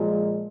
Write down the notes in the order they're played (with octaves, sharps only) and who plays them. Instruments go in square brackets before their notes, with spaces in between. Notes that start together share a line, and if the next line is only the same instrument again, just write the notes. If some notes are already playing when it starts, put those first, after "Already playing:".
Already playing: [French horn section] A#2 F3 G#3